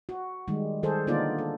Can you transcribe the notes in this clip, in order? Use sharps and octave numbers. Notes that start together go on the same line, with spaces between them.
F#4
D#3 G3 G#3
D#3 G3 G#4 A4 C5
D3 A#3 B3 D#4 F4 D5
A4